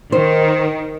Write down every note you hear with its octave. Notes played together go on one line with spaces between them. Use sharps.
D#3 C5